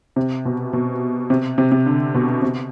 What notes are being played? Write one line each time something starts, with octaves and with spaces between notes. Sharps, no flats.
C3
B2
B2
C3
C3
C3
D3
B2
C3